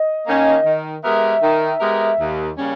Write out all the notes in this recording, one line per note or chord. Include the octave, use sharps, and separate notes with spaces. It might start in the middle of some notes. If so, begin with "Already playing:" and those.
Already playing: D#5
D#3 A#3 C#4
D#3
G#3 B3 G4 A#4 E5
D#3
G#3 B3 G4 A#4
D#2
C#3 G3 A#3 C#4